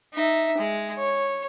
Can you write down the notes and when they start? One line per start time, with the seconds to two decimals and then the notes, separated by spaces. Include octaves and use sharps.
0.14 D#4 E5
0.58 G#3
0.98 C#5